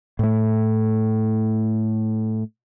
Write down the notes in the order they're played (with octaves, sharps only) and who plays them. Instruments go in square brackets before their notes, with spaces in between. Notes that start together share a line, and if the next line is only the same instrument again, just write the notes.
[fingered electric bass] A2 A3